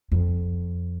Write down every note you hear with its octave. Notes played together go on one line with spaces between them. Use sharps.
F2